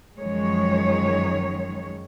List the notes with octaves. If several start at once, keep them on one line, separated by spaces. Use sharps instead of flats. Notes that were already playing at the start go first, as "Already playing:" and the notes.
F#2 D#3 F3 G#3 C#5